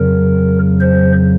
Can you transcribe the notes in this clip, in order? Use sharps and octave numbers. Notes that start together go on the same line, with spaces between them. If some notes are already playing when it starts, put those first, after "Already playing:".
Already playing: F2 C#3 F#3 A#4
C5